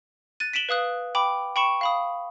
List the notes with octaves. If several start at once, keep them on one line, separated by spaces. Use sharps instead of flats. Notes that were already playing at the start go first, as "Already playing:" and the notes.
F#6 A6 D#7
B6 D7 E7 F#7 G7
B4 F5 D#6 F#6
G5 B5 D6
G5 B5 C#6 C#7 E7
F5 B5 D#6